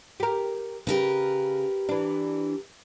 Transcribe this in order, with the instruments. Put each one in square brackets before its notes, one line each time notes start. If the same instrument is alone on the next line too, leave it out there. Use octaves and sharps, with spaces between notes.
[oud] G4 A#4
[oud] C#3 [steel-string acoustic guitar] G4 A#4 B4
[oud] E3 D4